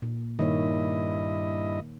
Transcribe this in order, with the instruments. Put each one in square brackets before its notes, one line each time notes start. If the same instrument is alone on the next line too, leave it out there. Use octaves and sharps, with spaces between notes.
[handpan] A#2
[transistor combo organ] G2 E4 D#5 [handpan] D#3 A#3 C#5